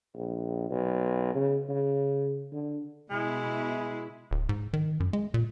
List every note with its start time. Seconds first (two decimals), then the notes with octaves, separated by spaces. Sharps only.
0.15 A#1
0.70 B1
1.34 C#3
1.68 C#3
2.52 D3
3.10 B2 G#3 E4
4.31 D1
4.49 G#2
4.73 D#3
5.00 F#2
5.13 G#3
5.34 A#2